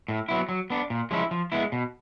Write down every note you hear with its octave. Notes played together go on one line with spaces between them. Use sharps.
A2
F#3 B3 E4
F#3
B3 D4
A#2
F3 G#3 C#4 E4
F3
G#3 B3 E4
B2